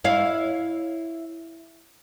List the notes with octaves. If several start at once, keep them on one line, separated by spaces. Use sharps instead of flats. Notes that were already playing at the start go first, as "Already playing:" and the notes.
E4 C#5 F5